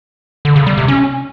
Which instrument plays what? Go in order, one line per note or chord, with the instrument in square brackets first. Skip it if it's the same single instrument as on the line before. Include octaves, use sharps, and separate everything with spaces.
[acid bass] D3
C#3
G3
C3
C#4